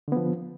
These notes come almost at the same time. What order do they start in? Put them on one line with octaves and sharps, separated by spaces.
D3 B3 F3